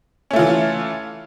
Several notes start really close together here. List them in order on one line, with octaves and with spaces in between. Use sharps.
C#4 A3 F4 E3